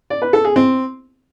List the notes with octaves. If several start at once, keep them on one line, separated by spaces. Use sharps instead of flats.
D5
B4
A4
G#4
C4